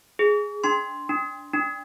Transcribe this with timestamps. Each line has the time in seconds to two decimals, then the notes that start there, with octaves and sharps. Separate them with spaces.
0.19 G#4
0.64 D4 C6
1.09 D4
1.53 D4